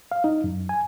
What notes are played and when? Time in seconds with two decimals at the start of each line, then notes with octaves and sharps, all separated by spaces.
0.12 F5
0.24 D#4
0.44 F#2
0.69 G#5